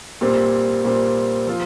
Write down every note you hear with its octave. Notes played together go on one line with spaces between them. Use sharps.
A#2 G3 C4
A#2 G3 C4
F3 C4 F4